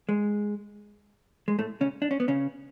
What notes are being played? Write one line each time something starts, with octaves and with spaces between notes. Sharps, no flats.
G#3
G#3
A2 A3
C#3 C#4
D4
C#4
B3
C#3 C#4